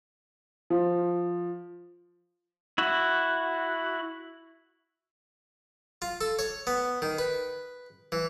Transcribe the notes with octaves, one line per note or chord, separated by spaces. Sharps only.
F3
E4 F#4
F4
A4
C#5
B3
D#3
B4
E3